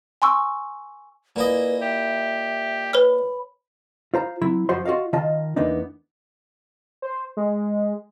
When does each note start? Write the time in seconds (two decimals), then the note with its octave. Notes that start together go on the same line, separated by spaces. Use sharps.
0.22 G#5 C6 C#6 E6
1.36 A#2 E4 B4 D#5
1.81 G4 E5
2.93 B4 C#5 B5 F6
4.14 F4 C5 A#5
4.42 F#3 C4 E4
4.69 F#2 F3 F#4 C5 C6
4.85 F4 F#4 A4 D#5 F5
5.13 D#3 F4 D#5 A5
5.56 E2 A#3 B3 D4 D#4
7.02 C5
7.37 G#3